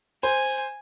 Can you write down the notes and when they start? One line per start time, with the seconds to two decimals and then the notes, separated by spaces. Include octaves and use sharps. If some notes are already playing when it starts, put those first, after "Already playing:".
0.23 C5 G#5